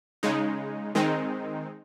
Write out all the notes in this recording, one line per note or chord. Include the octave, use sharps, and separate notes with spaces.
C#3 G#3 D#4
D#3 G#3 C4 D#4